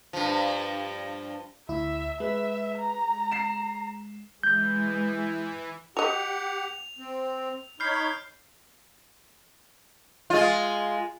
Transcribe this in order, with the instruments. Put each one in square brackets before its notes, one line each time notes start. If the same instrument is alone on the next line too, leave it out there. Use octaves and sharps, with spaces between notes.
[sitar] G2 F3
[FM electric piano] D2 E4 [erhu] E5
[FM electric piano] G#3 [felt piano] B4 [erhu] E5
[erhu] A#5
[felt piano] C7 E7
[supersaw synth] E3 [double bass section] G#3 [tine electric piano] G6
[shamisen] F#4 D#5 [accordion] G4 F#5 [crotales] F7
[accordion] C4
[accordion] D#4 C#5 B5 [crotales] F6 G6 C7
[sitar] G#3 F4